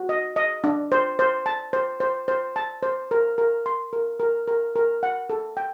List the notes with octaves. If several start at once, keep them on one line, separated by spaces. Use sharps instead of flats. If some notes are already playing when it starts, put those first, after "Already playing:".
Already playing: F#4
D#5
D#5
D4
C5
C5
A5
C5
C5
C5
A5
C5
A#4
A#4
C6
A#4
A#4
A#4
A#4
F#5
A4
G5